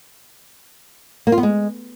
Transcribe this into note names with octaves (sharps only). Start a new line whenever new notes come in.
A#3
F4
B3
G#3